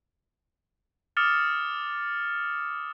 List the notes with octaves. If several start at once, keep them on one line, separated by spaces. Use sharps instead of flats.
D6 D#6 F6 A6 C#7 E7